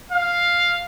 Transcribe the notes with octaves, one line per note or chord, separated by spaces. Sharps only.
F5